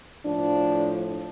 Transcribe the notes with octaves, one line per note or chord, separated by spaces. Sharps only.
A2 F3 D4